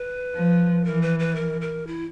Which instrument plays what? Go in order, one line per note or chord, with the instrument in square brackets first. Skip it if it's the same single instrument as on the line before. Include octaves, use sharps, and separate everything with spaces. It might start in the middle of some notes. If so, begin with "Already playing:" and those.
Already playing: [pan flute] B4
[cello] F3
[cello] E3 [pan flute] A#4
[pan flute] B4
B4
A#4
A#4
E4